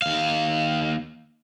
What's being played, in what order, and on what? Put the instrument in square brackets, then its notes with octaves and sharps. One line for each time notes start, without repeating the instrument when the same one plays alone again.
[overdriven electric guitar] D#2 F5